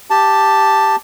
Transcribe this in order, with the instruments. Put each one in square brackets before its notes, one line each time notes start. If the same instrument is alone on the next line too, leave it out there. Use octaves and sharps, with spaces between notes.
[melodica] G4 A5